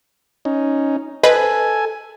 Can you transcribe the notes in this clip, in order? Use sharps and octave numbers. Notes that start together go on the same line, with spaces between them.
C#4 D#4
A4 B4 C5 D#5 G#5